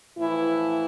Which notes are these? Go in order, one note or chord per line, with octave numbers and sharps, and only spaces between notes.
A2 E3 F3 E4